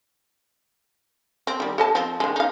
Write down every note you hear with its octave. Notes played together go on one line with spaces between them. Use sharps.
C4
D#3 G3
A4 D#5 A5
F3 C4
D#3 G#3
D#4 F5